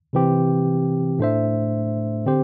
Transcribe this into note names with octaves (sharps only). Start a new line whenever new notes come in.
C3 E3 C4 G4
A2 A3 D4 C5 E5
D3 C4 G4 C5